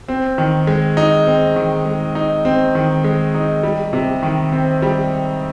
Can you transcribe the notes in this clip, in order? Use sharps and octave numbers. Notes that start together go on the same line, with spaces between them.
C4
D#3
G#3
D#4
C4
D#3
G#3
D#4
C4
D#3
G#3
D#4
G3
C3
D#3
C4
G3